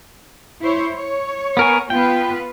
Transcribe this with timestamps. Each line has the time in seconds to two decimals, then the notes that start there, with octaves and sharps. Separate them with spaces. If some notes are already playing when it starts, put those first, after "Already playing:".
0.60 E4 C5 C#5
0.93 C#5
1.57 B3 A#4 G#5
1.90 B3 F4 B4 G5